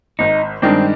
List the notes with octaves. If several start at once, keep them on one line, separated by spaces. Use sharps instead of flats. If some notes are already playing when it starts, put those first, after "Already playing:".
G#1 D#4
G2 D#3 G#3 C4 D4